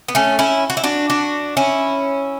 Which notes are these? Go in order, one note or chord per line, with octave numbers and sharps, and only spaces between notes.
B3
A3 C#4
C#4 E4
F#4
E4
D4 F#4
D4 F#4
C#4 E4